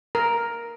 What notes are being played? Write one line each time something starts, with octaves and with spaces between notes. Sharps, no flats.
A#4